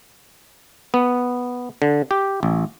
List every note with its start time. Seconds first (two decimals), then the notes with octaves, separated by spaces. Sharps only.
0.94 B3
1.82 D3
2.11 G4
2.43 A1